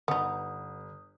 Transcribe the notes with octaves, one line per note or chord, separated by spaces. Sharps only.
G1 B3 D#4 D#6